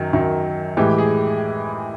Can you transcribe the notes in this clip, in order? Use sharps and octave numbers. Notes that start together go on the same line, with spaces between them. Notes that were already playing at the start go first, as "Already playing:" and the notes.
Already playing: F#2 D#3 F#3
F#2 D#3 F#3
A2 E3 G#3 G4
G#4